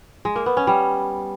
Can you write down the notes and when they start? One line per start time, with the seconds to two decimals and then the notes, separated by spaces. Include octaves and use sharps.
0.25 G#3
0.36 A#3
0.46 B3
0.57 C#4
0.67 G3